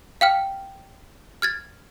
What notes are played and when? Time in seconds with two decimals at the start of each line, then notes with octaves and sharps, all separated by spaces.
0.21 F5 G5 F6
1.42 F6 G#6 A6